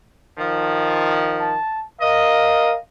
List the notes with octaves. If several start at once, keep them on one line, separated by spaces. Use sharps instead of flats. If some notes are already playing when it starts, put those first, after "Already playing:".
D#3 F3
A5
A#4 D#5 F5